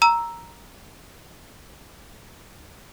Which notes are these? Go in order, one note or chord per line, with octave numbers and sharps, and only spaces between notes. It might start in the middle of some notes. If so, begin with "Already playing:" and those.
A#5 E6 E7